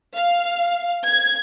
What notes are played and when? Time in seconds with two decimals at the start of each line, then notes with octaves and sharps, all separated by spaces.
0.15 F5
1.06 G#6